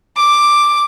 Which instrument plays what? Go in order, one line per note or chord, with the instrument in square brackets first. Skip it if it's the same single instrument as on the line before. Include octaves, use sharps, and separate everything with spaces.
[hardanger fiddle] D6